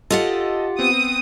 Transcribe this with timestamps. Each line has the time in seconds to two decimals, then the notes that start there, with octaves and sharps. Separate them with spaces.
0.10 F4 G4 A4 D#5 F#5
0.79 B3 C4 D#6